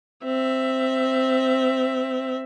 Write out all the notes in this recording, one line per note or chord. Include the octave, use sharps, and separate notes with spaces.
C4 E5